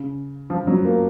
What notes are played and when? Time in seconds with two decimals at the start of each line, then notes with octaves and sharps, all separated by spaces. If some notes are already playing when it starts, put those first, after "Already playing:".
Already playing: C#3
0.50 F3
0.67 F#3
0.85 A#3